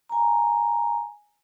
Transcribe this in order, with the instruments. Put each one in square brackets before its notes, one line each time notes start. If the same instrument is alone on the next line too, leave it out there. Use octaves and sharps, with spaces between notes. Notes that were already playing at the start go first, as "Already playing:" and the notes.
[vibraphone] G#5 A#5